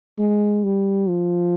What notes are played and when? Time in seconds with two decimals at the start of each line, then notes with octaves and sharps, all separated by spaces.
0.18 G#3
0.64 G3
1.08 F3